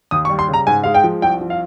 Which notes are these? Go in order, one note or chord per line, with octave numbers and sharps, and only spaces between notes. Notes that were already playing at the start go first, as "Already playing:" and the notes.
D#2 D#6
C#6
G3
C6
C#3
A#5
G#2 G#5
G#3 F5
G5
F3
C2 G5
F3
F5